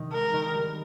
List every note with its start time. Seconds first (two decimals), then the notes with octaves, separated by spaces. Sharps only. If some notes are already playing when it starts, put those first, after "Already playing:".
Already playing: C3 D#3
0.13 G#3 A#4
0.33 D#3
0.54 G3